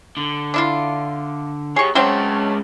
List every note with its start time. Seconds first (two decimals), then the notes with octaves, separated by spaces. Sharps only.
0.17 D3
0.54 D4 E4 F4
1.76 G4 G#4 C#5 C#6
1.95 F#3 G#3 A3 C4 C#4